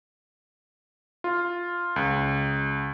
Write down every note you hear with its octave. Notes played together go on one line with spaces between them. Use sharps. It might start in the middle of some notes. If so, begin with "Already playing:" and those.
F4
C#2